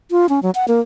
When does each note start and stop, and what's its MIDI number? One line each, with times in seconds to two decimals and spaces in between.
0.11 0.29 65
0.29 0.40 61
0.43 0.51 54
0.55 0.65 78
0.68 0.80 58